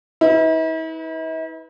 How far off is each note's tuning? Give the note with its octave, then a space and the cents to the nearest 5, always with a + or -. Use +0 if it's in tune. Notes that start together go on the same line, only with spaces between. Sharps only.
E4 -45 B4 +0